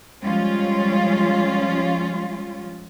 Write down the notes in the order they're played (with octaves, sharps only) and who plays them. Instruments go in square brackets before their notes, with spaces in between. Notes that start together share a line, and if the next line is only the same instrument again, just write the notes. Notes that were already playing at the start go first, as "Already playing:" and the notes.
[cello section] F3 G3 G#3 C#4 F4